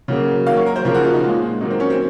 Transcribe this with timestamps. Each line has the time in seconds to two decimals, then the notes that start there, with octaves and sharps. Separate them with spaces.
0.08 C#3 F#3 A#3
0.47 D#3 F#3 A#3 F5
0.56 C#5
0.66 A#4
0.76 C5
0.85 C#3 F3 A#3 A#4
0.94 F#4
1.04 F4
1.13 D#4
1.23 A#2 G#3 F4
1.61 D#3 F#3 A#3 D#4
1.71 C4
1.80 C#4
1.90 C4